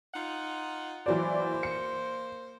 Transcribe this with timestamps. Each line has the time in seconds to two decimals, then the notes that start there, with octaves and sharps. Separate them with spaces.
0.14 D#4 F4 F#5
1.06 E3 F#3 A#3 C5 D5
1.63 C#7